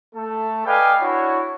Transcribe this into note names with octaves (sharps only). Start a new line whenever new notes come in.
A3 A4
B4 D5 D#5 F5 G5 G#5
D4 E4 F#4 C#5